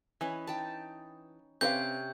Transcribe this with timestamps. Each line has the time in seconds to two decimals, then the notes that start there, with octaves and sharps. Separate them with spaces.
0.21 E3 C#4 B4 D#5
0.47 D#4 G5 A5
1.61 C3 C4 C#4 B4 F5 D6 G6